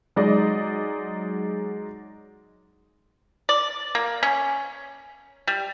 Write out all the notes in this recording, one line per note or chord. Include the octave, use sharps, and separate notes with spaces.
F#3 G#3 D#4 D5 D#5
D5
A#3
C#4
G3